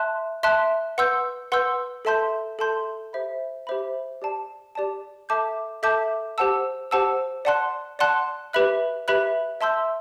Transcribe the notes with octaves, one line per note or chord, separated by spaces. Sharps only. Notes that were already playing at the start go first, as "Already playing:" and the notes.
Already playing: E5 A5 C6 F#6
E5 A5 C6 F#6
B4 F#5 C6 E6 G6
B4 F#5 C6 E6 G6
A4 E5 A5 C6 G6
A4 E5 A5 C6 G6
G4 C5 E5 B5
G4 C5 E5 B5
G4 D5 A5
G4 D5 A5
A4 E5 A5 D6 G6
A4 E5 A5 D6 G6
G4 C5 F#5 A5 E6
G4 C5 F#5 A5 E6
D5 F#5 A5 C6 F#6
D5 F#5 A5 C6 F#6
G4 B4 E5 B5 F#6
G4 B4 E5 B5 F#6
E5 A5 C6 E6 G6